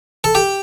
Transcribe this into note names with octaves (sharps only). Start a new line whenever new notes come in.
A4
G4